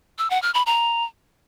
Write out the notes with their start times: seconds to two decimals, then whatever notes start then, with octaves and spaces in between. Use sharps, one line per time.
0.18 E6
0.30 F#5
0.42 F6
0.54 B5
0.66 A#5